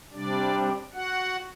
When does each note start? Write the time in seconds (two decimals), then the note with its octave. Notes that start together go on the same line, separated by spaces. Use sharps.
0.12 C3 G3 D4 D5
0.94 F#4 F#5